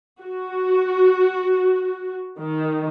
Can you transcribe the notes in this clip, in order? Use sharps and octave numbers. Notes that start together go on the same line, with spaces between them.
F#4
D#3